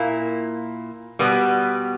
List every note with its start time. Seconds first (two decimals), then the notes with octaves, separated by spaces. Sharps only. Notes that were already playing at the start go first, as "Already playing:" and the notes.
Already playing: A#2 A#3 E4
1.19 B2 G3 B3